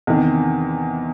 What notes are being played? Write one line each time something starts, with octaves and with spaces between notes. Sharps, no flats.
E2 C3 D#3